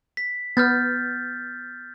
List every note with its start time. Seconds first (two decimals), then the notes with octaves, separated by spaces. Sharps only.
0.17 B6
0.57 B3 F6 G6 A6